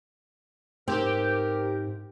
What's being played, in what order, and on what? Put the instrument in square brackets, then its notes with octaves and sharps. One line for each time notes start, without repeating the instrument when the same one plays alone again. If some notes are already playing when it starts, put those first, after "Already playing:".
[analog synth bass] G#2 [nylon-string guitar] C4 [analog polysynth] G4 [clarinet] A#4